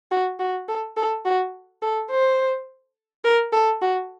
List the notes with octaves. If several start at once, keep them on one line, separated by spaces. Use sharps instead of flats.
F#4
F#4
A4
A4
F#4
A4
C5
A#4
A4
F#4